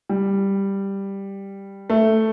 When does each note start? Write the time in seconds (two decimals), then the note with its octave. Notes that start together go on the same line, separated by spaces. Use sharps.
0.09 G3
1.90 A3